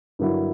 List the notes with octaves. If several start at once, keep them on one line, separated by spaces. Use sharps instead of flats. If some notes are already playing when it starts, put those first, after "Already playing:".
G2 D3 F#3 A#3 E4